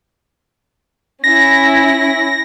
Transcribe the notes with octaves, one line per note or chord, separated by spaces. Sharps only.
C#4 E4 A#6